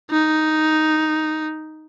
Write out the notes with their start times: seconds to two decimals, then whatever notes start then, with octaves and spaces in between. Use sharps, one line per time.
0.11 D#4